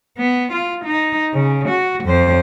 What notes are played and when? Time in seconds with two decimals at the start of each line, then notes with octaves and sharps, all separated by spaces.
0.17 B3
0.52 F4
0.84 D#4
1.34 C#3
1.68 F#4
2.04 F2 C5